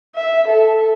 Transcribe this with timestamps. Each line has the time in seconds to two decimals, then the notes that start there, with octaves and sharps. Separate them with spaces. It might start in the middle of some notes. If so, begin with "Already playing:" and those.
0.15 E5
0.48 A4